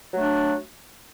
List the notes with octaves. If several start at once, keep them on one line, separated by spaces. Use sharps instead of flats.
F#3 A3 D4